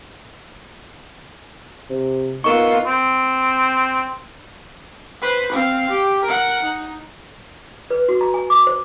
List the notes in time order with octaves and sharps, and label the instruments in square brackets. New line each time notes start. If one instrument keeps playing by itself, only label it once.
[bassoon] C3
[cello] B3 F4 [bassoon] D#4 [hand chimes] A#4 C#6
[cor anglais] C4
[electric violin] B4 C5
C4 F5
G4
A#4 F#5
D#4
[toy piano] B4
F#4
A#5
G#5
D6
C5